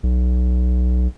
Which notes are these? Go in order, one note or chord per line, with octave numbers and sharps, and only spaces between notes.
B1